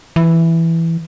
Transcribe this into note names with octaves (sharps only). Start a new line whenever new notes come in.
E3